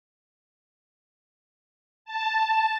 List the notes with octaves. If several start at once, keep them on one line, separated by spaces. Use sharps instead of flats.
A5